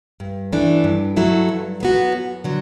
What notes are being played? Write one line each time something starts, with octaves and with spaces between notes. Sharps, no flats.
G2
E3 A3 D4
G2
F#3 A3 E4 A4
G2
F#3 B3 F#4
F#2
D3 F#3